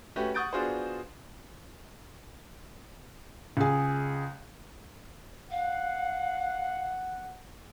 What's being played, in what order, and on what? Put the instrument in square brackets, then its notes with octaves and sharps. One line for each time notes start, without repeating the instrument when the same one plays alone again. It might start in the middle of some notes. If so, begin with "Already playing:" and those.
[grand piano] A3 C#4 F#4 G4 B4
F#5 C#6 D#6 G6 A6 D7
B3 D4 F4 F#4 G#4 C5
[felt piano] C#2 G#4
[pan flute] F5 [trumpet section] F#5